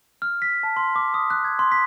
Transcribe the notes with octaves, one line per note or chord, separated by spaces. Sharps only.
F6
B6
A5
C6
D6
D#6
F#6
G#6
C6
B6